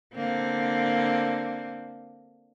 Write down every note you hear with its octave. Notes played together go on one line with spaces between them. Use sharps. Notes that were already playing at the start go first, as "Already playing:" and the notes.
D3 A#3 C4